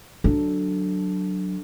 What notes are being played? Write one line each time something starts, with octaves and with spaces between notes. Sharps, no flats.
F#3 D4 A4